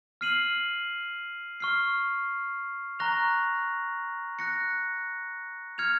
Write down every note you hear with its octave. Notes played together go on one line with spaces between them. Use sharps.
F6 C7 D#7 F#7
C#6 F6 C7
A#5 C#6 F#6 A#6 F7
F#6 A#6 C#7
F6 G#6 C#7 F7